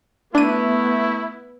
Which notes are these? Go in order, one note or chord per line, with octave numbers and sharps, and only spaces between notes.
A3 B3 D4 E4 D#7